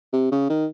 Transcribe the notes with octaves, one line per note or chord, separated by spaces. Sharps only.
C3
C#3
D#3